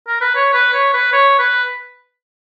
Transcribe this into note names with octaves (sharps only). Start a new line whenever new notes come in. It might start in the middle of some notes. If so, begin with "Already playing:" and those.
A#4
B4
C#5
B4
C#5
B4
C#5
B4